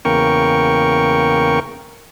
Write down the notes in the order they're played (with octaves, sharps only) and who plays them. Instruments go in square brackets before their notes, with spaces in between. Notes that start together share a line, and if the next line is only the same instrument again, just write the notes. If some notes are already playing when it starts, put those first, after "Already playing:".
[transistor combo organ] E2 C#3 A#3 A#4 G5 C#6